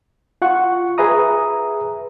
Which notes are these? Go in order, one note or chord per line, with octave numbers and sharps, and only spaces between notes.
F4 F#5 C#6
G#4 B4 E5 A#5 D#6